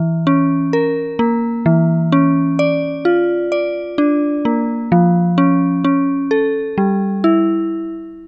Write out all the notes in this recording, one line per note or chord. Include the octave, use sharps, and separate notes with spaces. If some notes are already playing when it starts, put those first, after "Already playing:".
Already playing: E3
C#4
A#4
A#3
E3
C#4
D5
F4
D5
D4
A#3
F3
C#4
C#4
A4
G3
E4